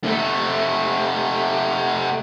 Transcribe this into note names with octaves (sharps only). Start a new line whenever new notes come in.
C3 A3